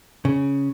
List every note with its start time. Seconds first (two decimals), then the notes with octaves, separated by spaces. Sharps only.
0.25 C#3